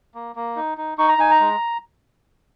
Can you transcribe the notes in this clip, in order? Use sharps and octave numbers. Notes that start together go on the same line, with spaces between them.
A#3
A#3
D#4
D#4
D#4 C#6
A#5
D#4 G#5
A#5
G#3